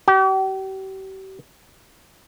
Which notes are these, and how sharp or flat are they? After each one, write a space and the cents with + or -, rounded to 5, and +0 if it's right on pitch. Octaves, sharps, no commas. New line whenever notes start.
G4 -40